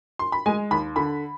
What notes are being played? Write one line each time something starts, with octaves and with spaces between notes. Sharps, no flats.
C6
B5
G#3 G#5
D#2 B5
D3 B5